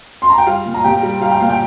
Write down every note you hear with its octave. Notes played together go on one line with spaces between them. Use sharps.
C6
A#5
G5
G3 F4 F5
A#2
A#5
A#2 G4 G5
G3
G3 F5
G5
A#2 F5
G5